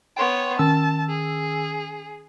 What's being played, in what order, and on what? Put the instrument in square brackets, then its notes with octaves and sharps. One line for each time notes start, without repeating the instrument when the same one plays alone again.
[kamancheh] B3 C#5 [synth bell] G5 C6
[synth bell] D#3 C#4 E6 [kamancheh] A5
[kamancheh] G#4